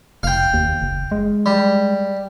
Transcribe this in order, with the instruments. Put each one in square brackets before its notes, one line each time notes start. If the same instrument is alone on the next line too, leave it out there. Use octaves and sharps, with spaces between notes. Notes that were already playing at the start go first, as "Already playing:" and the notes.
[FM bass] F1 [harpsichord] F5 G5
[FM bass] D#2
F#1
G#3
[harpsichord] G3